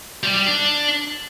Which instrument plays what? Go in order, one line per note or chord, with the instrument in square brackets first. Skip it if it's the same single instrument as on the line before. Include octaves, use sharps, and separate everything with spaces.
[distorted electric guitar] G3
G3
D4